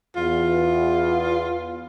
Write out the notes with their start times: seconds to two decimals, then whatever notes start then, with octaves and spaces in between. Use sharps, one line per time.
0.16 E2 F4